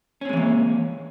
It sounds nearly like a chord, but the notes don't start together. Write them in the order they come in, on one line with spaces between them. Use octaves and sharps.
C#4 C4 G#3 E3 A#3